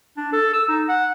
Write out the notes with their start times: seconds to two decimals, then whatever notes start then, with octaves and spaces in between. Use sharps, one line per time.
0.17 D4
0.33 A4
0.53 E6
0.68 D#4
0.88 F#5